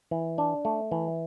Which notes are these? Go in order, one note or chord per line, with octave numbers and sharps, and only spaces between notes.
E3
D4
A3
E3